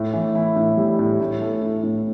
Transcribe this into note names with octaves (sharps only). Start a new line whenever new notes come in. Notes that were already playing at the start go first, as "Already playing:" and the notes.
Already playing: A2
E3
E4
A2
G3
A2
A2
A3
A2
A2